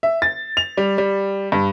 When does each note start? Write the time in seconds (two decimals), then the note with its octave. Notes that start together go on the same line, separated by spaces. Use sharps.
0.03 E5
0.22 A6
0.57 F7
0.77 G3
0.98 G3
1.52 G2